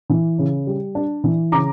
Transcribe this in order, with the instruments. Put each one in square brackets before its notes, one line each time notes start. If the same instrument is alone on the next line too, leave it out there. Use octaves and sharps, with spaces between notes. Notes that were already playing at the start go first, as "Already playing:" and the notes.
[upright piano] E3
C#3
G3
D4
E3
C#3 A#5 D6